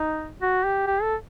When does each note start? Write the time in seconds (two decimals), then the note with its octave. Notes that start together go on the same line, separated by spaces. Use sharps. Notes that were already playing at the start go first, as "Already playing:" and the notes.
Already playing: D#4
0.42 F#4
0.64 G4
0.87 G4
1.02 A4